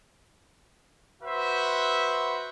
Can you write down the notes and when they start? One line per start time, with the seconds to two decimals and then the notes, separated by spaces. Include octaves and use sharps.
1.22 F#4 B4 C5 E5